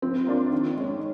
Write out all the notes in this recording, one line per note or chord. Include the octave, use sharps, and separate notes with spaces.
F3 C4
A#3 D4 F4
D#3
G#3 C#4